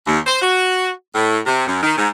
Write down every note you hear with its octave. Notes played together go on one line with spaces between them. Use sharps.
D#2
C5
F#4
A2
C3
F#2
D#3
G#2